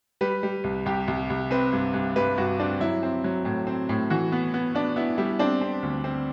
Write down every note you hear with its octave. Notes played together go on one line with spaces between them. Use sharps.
G3 B4
G3
C2
C2 G4
C2
C2
C4 B4
G2
G2
G2 B4
G2 F#4
C4 D4
F#3 E4
C4
F#3
A2
C4
A2
E3 F#4
B3
B3
B3 D4
B3 E4
G3 E4
C4 D4
C4
D2
C4